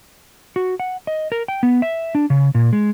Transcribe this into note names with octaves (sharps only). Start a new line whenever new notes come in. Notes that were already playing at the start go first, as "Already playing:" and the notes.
F#4
F#5
D#5
A#4
G5
B3
E5
D4
C#3
A#2
G#3